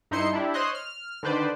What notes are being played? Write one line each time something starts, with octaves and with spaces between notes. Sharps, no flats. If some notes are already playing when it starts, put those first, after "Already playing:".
G2 D#4 E4 C5 C6 C#7
D4 E4 G4
C5 C#5 D#5 C6 F#6
F6
D3 D#3 B4 C5 D5